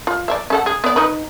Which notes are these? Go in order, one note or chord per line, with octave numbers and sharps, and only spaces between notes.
F4
D5 E5 F5
C#4 A4 F#5
G#4
B3 D5
D#4 B4 B5